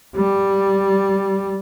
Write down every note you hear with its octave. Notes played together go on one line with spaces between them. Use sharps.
G3